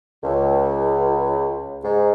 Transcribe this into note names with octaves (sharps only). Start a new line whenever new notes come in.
C#2
G#2